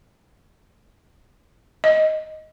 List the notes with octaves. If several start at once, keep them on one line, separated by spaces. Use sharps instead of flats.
D#5